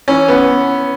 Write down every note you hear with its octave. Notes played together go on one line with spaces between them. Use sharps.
E3 C#4
B3